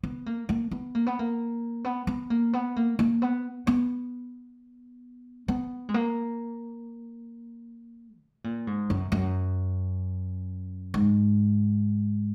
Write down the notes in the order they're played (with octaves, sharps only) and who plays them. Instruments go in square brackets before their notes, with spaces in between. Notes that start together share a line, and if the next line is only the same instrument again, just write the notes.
[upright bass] B3
A#3
A#3
B3
A#3
B3
A#3
B3
B3
A#3
B3
A#3
A#3
B3
B3
B3
G#3
A#3
B2
A#2
G#2
F#2
F#2
G#2